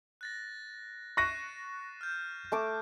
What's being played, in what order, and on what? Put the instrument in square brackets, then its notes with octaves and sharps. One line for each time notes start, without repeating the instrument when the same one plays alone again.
[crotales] F#6 A6 A#6
[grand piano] C#6 F#6 A#6 [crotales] C7 D#7 E7
[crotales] F6 G6
[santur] A3 A5 D6